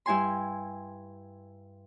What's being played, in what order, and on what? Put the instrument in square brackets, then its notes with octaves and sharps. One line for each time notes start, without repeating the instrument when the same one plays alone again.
[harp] G2 E4 G#5 C6